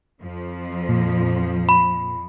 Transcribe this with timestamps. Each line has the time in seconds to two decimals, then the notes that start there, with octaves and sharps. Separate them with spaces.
0.21 F2 F3
0.89 A#2
1.69 B5